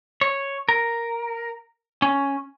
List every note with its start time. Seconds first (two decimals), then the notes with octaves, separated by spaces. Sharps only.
0.21 C#5
0.69 A#4
2.02 C#4